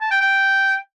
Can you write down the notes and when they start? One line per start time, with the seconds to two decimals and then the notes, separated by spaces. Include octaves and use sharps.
0.01 A5
0.11 G5
0.21 G5